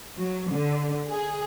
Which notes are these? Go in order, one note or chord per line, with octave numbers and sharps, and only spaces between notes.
F#3
D3
G#4